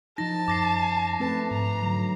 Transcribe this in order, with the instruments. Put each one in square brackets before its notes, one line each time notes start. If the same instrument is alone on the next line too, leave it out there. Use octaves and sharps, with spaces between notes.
[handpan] F3 D#4 [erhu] A5 [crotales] A#6
[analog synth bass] F#2 [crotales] D6 A#6 C7
[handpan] A3 B4 [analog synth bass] C4 [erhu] A5
[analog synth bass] G#2 [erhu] A#5
[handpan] D3 F#3